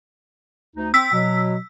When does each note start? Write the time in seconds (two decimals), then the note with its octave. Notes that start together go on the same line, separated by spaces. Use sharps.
0.76 D2 D#4
0.94 C4 E6 B6
1.13 B2 F#3